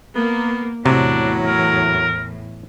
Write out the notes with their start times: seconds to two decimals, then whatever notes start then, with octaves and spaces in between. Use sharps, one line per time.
0.15 A#3 B3
0.86 E2 A2 C3 F#3 D4
1.46 A#4